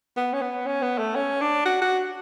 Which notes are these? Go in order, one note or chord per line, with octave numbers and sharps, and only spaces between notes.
B3
C#4
B3
C#4
B3
A3
C#4
D4
F#4
F#4